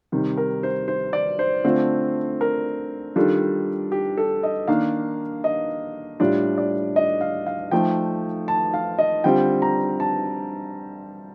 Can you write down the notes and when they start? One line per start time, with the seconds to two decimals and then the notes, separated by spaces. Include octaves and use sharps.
0.12 C3 D#3 G3
0.37 A#4
0.63 C5
0.88 C5
1.13 D5
1.39 C5
1.64 D3 A3 C4 F4
2.41 A#4
3.16 D#3 G3 D4 F4 A4
3.92 G4
4.17 A4
4.43 D#5
4.68 D#3 A#3 D4 F5
5.44 D#5
6.20 A2 G3 D4 F4 D5
6.58 D5
6.96 D#5
7.21 F5
7.46 F5
7.71 F3 A3 D#4 G5
8.48 A5
8.74 F5
8.99 D#5
9.24 D3 G3 C4 F4 G5
9.62 A#5
10.00 A5